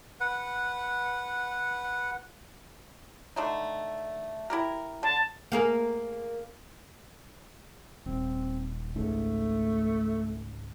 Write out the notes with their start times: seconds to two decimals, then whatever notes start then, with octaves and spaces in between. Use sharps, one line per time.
0.20 B4 F#5
3.36 D3 A3 D#4
4.50 E4 G4 A#4
5.03 D3 A5
5.52 A#3 G#4 A#4
8.06 D#1 C4
8.96 G#1 C#2 G#2 A3